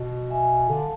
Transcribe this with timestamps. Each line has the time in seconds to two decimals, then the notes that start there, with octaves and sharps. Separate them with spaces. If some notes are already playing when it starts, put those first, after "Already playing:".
Already playing: B2
0.30 E5 G#5
0.69 D3 F5 A5